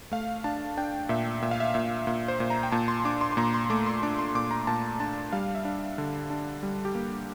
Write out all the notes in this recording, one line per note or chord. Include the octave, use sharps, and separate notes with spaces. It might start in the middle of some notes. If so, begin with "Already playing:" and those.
A3 F5
D4 A5
D4 G5
A#2 E5
A#2 E5
F5
E5
A#2 E5
A#2
C5
A#2
A#5
G5
A#2 A5
C6
D4 D6
C6
C6
A#2 A#5
C6
A3 D6
C6
D4 D6
C6
A#2 D6
A#5
A#2 A5
D4 A5
G3 F5
E5
D4
D3
D4
G3
G4
A#3